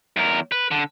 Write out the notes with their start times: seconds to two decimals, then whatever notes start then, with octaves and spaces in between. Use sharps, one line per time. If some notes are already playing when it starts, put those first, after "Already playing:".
0.17 E2 A#4
0.52 B4
0.71 D3